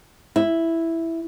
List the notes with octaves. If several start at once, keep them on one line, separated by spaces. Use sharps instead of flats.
E4